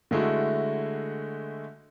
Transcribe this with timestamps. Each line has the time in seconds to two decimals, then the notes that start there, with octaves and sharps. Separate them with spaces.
0.11 D3 G#3 A3 E4 F#4